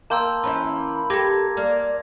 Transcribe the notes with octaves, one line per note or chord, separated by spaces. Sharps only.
A#3 G5 A5 C6 E6
E3 C#4 E4 B5
G4 A4 D6 G#6 A#6
A#3 D5